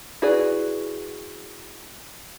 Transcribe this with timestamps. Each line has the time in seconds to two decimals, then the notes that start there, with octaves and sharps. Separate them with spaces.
0.22 E4 F#4 G#4 B4 D5